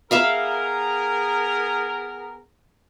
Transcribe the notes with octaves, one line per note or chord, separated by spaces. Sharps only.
B3 G#4 A#4 E5 F5 B5